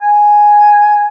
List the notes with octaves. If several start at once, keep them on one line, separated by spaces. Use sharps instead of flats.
G#5